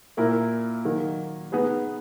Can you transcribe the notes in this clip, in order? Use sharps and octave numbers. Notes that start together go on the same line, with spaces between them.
A#2 A#3 E4 A#4
D#3 F#3 A#3 D#4
B3 D#4 G#4 B4